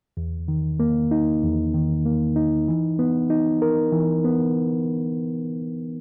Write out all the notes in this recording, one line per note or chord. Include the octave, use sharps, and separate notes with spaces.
E2
D#3
A#3
D#4
E2
D#3
A#3
D#4
E3
B3
D#4
A#4
E3
B3